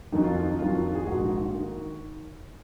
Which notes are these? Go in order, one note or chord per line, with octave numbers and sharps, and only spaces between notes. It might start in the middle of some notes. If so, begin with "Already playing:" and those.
F2 D#3 F#3 D#4
F4
F4
D#4
F2 D#3 F#3 F4
F4
F4
G#4
A#1 G#2 D#3 F#4
D#3